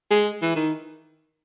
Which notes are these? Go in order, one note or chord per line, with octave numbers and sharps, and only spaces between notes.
G#3
E3
D#3